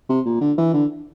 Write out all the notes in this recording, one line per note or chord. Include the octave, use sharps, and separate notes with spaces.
C3
A#2
D3
E3
D3